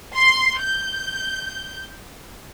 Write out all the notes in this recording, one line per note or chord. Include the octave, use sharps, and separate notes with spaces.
C6
G6